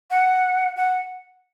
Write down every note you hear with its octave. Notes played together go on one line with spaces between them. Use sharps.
F#5
F#5